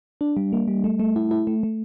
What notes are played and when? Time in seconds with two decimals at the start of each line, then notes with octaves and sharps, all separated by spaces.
0.21 D4
0.37 G3
0.53 A#3
0.68 G3
0.84 A3
1.00 A3
1.16 E4
1.31 E4
1.47 A3
1.63 A3